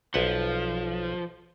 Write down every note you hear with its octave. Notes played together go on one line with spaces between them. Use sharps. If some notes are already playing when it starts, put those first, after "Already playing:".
B1 F3 B4 F#5